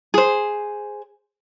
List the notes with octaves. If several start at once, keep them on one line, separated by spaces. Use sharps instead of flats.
G#4 C5